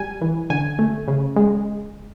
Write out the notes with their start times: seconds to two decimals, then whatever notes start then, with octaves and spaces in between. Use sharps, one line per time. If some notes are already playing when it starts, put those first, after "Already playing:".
Already playing: G3 G#5
0.21 E3
0.50 D3 G#5
0.79 A3
1.08 C#3
1.36 G#3